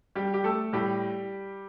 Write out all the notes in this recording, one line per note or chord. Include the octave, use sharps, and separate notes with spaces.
G3 G4
G4
A3 A4
A2 G3 G4